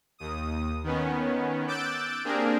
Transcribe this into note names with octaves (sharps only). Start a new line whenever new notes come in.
D#2 D#6
D#3 B3 C#4
D6 E6 F#6 G6 A6 D7
A#3 C4 D4 G4 G#4 A#4